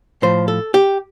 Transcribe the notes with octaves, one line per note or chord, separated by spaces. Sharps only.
A2 F3 C5
A4
G4